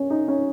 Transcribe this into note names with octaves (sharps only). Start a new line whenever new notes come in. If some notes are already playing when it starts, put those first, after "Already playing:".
Already playing: C#4
D#4
C#4